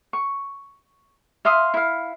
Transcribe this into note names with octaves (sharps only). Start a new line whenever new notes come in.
C#6
E5 F5 C6 D#6
E4 F5